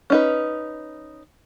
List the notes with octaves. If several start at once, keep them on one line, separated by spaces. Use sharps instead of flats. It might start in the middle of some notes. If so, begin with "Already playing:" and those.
C#4 D#4 B4